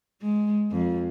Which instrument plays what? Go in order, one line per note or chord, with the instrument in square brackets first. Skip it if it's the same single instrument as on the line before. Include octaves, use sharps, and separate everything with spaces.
[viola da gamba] G#3
F2